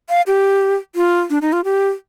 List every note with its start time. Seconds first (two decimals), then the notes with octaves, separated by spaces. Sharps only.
0.09 F5
0.27 G4
0.95 F4
1.30 D4
1.42 D#4
1.53 F4
1.64 G4